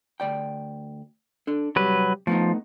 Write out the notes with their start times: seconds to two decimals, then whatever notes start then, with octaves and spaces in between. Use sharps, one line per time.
0.20 D2 D5 G5
1.47 D4 A4
1.76 C3 F#3 G3 G4 B4
2.27 F3 A3 B3 D#4